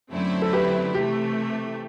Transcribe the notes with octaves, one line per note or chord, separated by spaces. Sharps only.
F#2 D3 A3 C4 E4
A4
G4 B4
C3 E3 A3 G4